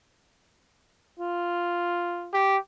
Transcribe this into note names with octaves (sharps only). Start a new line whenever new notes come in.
F4
G4